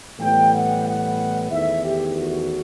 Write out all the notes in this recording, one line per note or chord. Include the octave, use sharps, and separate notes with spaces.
A2 E3 G3 B3 G5
F#5
F#5
E2 D#3 A3 E5
G4
F#4